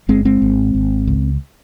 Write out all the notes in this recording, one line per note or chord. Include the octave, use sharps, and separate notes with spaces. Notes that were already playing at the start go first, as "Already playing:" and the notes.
G1 G#3 C4
G#3 C4
G#1
G#1
C#2